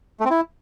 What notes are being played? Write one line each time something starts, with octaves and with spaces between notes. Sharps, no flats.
A3
C4
E4